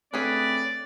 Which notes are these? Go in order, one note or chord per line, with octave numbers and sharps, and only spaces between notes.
D3 A3 C4 C#4 G#4 B4 D5